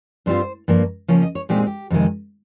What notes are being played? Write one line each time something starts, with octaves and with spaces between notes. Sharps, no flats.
G2 G3 C4 F4 C5
G2 F3 A#3
C#3 F3 A#3 C#4 C#5
D#5
C#5
A#2 G#3 C4 D#4 G4
G#4
G4
F2 C3 D#3 G#3